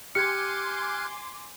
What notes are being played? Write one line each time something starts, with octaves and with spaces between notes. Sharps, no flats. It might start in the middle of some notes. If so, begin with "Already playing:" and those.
G4 G#5 C6 D6 F6 F#6 G#6 C#7